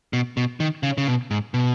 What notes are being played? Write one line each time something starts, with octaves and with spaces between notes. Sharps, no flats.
B2
B2
D#3
C#3
C#3
B2
G#2
B2